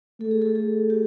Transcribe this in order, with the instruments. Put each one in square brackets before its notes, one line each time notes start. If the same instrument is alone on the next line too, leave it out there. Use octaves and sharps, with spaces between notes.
[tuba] A3 [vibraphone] A4
[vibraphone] G#4
A4
G#4
G4